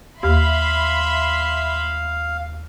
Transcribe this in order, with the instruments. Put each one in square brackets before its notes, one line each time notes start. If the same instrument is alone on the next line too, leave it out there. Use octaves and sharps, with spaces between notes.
[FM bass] D#2 [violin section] E5 B5 C6 [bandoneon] F5